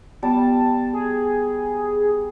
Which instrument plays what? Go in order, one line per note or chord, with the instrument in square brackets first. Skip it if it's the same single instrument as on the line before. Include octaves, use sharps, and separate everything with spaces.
[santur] G3 [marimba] B3 [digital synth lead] A5
[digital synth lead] G#4